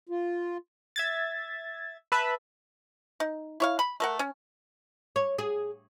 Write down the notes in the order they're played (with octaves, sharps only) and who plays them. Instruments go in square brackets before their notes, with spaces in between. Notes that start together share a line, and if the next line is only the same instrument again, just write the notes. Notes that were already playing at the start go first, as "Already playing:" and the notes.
[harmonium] F4
[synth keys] E5 G#6 A6
B4 E5 A5 B5
[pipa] D#4
E4 C#5 F5
B5
A3 A#4 F#5
C#4
[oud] C#5
G#4